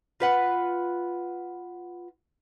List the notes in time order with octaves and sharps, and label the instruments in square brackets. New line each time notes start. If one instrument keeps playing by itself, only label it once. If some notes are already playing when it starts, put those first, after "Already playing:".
[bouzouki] F4 B4 F#5